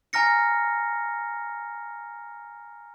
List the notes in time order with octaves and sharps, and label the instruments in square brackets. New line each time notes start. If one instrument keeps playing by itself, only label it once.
[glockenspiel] G#5 A#5 F6 A#6 C#7